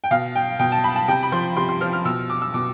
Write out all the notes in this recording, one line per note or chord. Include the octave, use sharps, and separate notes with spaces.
G5
B2 F5
G5
B2 G5
A5
B5
A5
C3 G5
B5
F3 C6
C3 C6
C6
F3 F6
F6
B2 E6
D6
E6
B2 D6